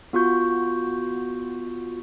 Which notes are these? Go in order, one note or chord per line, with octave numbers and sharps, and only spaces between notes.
B3 F4 F#4 C#6 G6